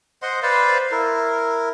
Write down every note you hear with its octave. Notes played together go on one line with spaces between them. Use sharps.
C5 D#5 F#5 C6
B4 C5 D5 F5
E4 A#4